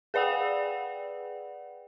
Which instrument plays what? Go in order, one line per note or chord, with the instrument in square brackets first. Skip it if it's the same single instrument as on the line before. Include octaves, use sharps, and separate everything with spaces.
[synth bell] G#4 B4 D5 F#5 G5